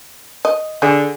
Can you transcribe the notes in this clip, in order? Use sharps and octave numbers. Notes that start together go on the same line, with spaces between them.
D#5
D3 G#4